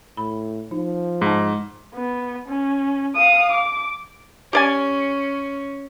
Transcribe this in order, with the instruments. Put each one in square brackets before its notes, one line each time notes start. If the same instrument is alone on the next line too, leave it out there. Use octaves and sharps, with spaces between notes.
[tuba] A2 [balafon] B5
[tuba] F3 [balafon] D#4
[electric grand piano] G#2 [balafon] D#4 A5
[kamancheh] B3
C#4
F5 D#6
D6
[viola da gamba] C#4 [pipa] G4 D5 G#5